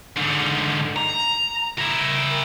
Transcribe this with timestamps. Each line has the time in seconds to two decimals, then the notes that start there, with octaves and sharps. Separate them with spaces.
0.16 G#2 D3
0.96 A#5
1.78 E4 A#4